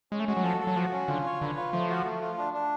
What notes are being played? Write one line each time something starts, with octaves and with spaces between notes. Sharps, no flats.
G#3 C#4
A3
G#3 F#4
F#3
F3 A4
A4
F#3
F3 F#4
C#4
D3 F4
C#5
D3 B4
F4
F3 A3
F#4
A3
F4
D4
D4